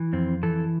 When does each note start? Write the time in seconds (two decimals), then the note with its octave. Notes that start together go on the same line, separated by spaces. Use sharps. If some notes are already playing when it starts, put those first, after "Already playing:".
Already playing: E3
0.13 F2 C4
0.43 E3 A4